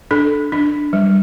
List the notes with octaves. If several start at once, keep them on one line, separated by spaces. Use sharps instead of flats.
D4 A4
D4
G3